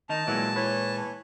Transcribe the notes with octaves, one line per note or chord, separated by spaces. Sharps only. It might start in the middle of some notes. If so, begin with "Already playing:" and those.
D#3 D#4 A5
A#2 E3 F#3 G#3
E3 B4 C#5